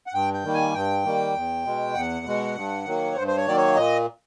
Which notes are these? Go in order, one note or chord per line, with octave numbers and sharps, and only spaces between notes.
F#5
G2 G5
G5
D#3 G3 A#3
G#5
G2 G5
D#3 G3 A#3
E2
B2 G#3
E2 F#5
B2 G#3
G2
D#3 F#3 A#3
C#5
G2 C5
C5
C#5
D#3 F#3 A#3 D5
C#5
A#2 D#5